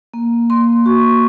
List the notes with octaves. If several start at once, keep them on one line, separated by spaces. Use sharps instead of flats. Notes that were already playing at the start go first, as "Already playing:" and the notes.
A#3
A#3 C6
F#4 C#6